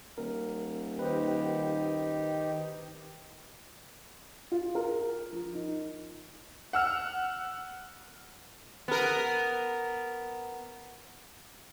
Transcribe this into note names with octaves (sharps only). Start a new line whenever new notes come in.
D#1 A#4
D#3 D#4 G4 B4 C5
F4
A#4
F3
D#4
F#5 E6 F6
B3 A#4